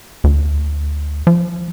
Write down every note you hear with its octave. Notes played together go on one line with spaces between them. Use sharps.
D2
F3